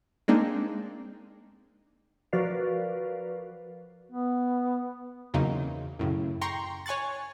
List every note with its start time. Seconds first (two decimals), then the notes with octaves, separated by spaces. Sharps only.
0.28 G#3 A#3 C4 D4 D#4
2.33 F3 F#4 A#4 B4 D5 F5
4.10 B3
5.34 E2 C#3 F#3 A#3 C4 D#4
5.99 F#2 A2 C#3
6.41 G5 A#5 C6 C#6
6.86 C#5 G#5 C#6 F#6 A6